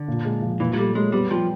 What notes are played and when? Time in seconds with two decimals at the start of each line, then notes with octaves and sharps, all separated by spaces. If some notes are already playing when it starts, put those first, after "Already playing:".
Already playing: D3
0.08 A#2
0.25 G#3
0.42 F3
0.60 A#2 E3
0.73 F#3
0.77 G3 A3
0.95 F#3 G#3
1.12 G3 B3
1.30 F3 G3